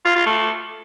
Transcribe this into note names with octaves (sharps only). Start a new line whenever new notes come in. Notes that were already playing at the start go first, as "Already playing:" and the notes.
F4
F4
A3